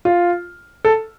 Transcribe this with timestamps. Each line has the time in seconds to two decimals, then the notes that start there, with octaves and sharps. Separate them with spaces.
0.05 F4
0.85 A4